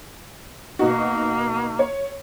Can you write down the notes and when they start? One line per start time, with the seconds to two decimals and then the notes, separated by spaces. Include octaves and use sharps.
0.79 B2 A#3 D#4 F#4
1.79 C#5